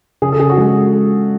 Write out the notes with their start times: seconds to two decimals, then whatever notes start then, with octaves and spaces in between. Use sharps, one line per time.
0.22 C#3 G#4
0.32 A4
0.39 C#3 G#4
0.50 F#4
0.57 G#3 G#4